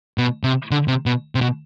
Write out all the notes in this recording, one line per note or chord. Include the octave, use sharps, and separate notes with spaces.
B2
C3
D3
C3
B2
C3
B2